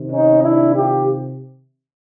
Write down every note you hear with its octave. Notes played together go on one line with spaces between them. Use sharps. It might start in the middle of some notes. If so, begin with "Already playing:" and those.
Already playing: C3 D#3
C#4 D#4
D4 E4
F4 G4